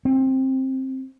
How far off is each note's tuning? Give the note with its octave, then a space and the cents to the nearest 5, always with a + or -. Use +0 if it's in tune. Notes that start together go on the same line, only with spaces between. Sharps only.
C4 +15